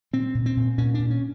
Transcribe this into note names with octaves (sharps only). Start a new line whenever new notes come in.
A#2 C4
A#2
C4
A#2
A#2 C#4
D4
A#2
C#4